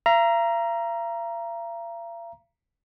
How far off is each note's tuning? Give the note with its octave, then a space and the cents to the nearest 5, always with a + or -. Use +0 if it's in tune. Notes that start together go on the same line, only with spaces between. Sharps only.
F5 -45 A#5 +5